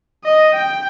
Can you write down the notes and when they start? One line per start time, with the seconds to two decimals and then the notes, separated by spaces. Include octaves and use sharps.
0.25 D#5
0.54 G5